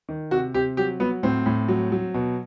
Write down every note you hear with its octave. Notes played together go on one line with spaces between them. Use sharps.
D#3
C3 F#4
C3 G4
F#3 G4
F#3 B3
A2 C4
A2
F#3
F#3
B2